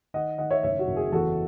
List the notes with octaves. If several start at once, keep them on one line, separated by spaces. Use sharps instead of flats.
D#3 D#5 F#5
D#3 D#5 F#5
C#5 E5
F#1 C#5 E5
F#4
F#1
G#4
E2 F#4 A4